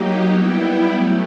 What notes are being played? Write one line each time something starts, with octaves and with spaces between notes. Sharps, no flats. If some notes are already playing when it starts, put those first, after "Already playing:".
Already playing: F#3 A#3 D#4 G4
G3 B3 E4 G4
F#3 A3